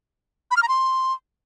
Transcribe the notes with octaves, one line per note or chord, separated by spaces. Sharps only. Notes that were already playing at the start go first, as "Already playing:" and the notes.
B5
F6
A#5
C6